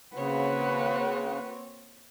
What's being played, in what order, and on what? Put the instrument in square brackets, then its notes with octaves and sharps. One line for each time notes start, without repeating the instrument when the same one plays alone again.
[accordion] C#3 [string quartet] A#3 C4 F#4 [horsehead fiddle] B4 F#5 [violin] C#5